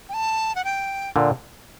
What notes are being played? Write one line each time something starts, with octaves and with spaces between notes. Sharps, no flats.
G5
A5
F#5
G5
A#2 D3